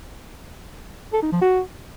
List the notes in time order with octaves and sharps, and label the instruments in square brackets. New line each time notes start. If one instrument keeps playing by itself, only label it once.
[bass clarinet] A4
D#4
F3
F#4